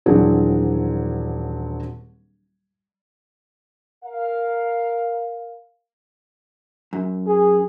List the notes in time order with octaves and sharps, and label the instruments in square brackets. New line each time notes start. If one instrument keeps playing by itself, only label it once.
[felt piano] D#1 E3 F#3 C4 D4 G#4
[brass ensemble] A#4 F5
[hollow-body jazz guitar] F#2
[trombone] G#4